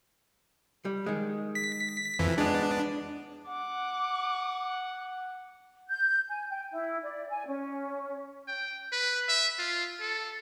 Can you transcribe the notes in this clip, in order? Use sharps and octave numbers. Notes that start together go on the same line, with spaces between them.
G3
D#3 G#3
B6
F2 E3
G#3 B3 D4
F#5 D6
G6
G#5
G5
E4
D5
G#5
C#4
G5
B4
E5
F4
A4